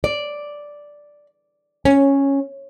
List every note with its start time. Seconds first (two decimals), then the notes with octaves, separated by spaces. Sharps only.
0.04 D5
1.85 C#4